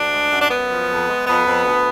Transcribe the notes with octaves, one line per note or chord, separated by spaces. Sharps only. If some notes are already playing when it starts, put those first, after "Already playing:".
Already playing: D2 D4
G#3
F#2
D4
F#2 B3
F3
F2
G#3
F2 B3
F2
D2